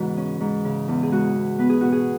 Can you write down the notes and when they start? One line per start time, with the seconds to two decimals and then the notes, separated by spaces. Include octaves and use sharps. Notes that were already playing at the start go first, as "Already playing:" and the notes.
Already playing: E2 G#2 C#3 E3 E4 F#4 G#4
0.17 C#4
0.40 G#2
0.64 C#3
0.88 E2
1.03 G#4
1.11 G#3 F#4
1.35 E2
1.58 B3 B4
1.69 G#4
1.81 B2 F#4
1.92 G#4